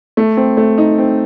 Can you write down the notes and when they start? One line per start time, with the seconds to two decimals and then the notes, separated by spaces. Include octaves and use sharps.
0.17 A3
0.37 C4
0.57 A3
0.78 D#4
0.98 C4